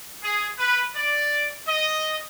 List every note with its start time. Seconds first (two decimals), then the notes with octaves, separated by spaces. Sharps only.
0.23 G#4
0.58 B4
0.95 D5
1.67 D#5